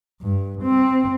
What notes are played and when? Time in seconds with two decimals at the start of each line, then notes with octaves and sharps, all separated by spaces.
0.22 G2
0.62 C4